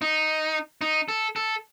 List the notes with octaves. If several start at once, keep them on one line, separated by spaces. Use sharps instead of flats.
D#4
D#4
A4
A4